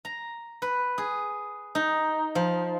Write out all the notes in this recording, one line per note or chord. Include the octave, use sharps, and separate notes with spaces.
A#5
B4
G#4
D#4
F3